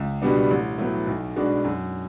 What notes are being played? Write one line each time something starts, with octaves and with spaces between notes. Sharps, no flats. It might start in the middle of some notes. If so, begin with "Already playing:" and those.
Already playing: C#2
B2 G3 B3 D4
A1
A2 F#3 B3
B1
B2 G#3 B3 D4
F#2